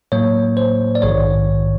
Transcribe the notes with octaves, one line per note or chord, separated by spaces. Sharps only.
A2 F#3 A#3 C#5
C5
D5
A#1 G#2 D#3 C#5